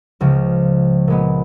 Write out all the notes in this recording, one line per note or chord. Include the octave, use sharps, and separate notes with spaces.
C#2 C#3 F3
A#2 G#3 B3